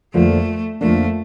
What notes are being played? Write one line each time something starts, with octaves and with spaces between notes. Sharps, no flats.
F2 D3 F3 A3 A#3 D4
F2 D3 F3 A3 A#3 D4